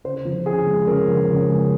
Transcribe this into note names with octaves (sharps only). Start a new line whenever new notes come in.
C#3 C5
F3
C#3 G#4
G#3
C#3 A#4
F3
C#3
G#3